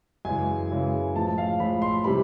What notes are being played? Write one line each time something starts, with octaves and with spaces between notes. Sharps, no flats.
F#2 C#3 E3 G#3 G#5
F#2 C#3 E3 G#3
A2 F3 G#3 A5
F5
A2 F3 G#3 B5
C6
C3 E3 G3 B5